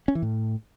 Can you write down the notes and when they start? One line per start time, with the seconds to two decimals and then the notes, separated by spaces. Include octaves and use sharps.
0.08 C#4
0.15 E3
0.22 A2